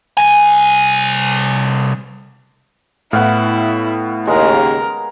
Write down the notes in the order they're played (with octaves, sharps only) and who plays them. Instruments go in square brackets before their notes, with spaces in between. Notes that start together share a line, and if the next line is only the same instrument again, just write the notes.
[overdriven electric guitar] C2 G#5
[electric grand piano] A2 [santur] B3 F5 [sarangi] E4
[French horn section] D#2 C#3 [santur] G#3 [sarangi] A#4